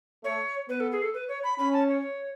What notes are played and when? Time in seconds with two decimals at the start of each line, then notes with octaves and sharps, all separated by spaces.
0.24 A3 C#5
0.68 B3 B4
0.80 A4
0.92 G#4
1.02 A4
1.14 B4
1.28 C#5
1.44 B5
1.58 C#4 B5
1.73 A5
1.88 C#5